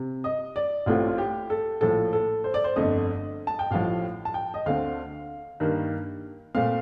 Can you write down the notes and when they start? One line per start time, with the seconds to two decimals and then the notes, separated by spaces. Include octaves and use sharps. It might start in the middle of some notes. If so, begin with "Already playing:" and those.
Already playing: C3
0.24 D#5
0.56 D5
0.86 A1 A2 A3 C4 F4
1.08 F4
1.18 G4
1.50 A4
1.81 A#1 A2 F3 A4
2.13 A4
2.44 C5
2.54 D5
2.64 C5
2.76 G1 F2 D3 A3 D#5
3.47 A5
3.59 G5
3.71 A1 A2 F3 F5
4.25 A5
4.34 G5
4.54 D#5
4.66 D2 D3 A3 C4 F5
5.60 G2 D#3 A#3
6.55 A#2 A3 C4 F5